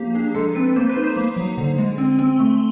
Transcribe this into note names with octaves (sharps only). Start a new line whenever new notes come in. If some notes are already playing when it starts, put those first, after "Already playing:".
Already playing: F3 A#3 G4
D4 G#4
G#3 A4
C4 B4
A#3 C5
B4
D#4
C5
A#3
F#3
D3
G#3
C4
C4
A3